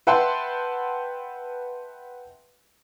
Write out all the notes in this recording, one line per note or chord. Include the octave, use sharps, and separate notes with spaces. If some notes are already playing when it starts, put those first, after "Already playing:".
B4 E5 F#5 G5 A5 C6